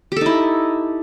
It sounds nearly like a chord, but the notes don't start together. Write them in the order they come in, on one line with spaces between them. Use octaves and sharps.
G4 A4 D#4 E4